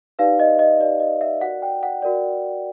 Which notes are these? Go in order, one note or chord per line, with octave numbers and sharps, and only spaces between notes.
D#4 G4 B4 D5 F5
D#5
D#5
D#4 G4 B4 D5 D#5
D#5
E5
F#4 A#4 D5 F#5
G5
F#5
F#4 A#4 D5